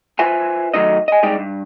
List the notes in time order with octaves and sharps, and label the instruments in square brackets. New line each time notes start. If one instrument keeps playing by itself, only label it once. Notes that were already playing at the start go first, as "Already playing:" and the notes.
[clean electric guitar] F4 B4 C5 E5 G#5
D#3 F#3 A3 D#4 D#5
D#5 G#5
G3 G#3 D#4 G4
G2